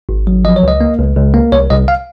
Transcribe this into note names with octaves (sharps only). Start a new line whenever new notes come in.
G#1
F#3
F3 D#5
C#5
C#2 D#5
A#3
C#2
C#2
A#3
C2 C#5
C2 D#5
F5